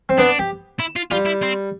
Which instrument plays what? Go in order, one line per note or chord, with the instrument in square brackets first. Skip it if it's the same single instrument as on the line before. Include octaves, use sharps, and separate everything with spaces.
[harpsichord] C4
[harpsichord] B3 [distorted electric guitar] D4
[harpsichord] G4
[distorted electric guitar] E4
F4
[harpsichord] G3 [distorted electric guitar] F4
[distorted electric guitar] E4
C4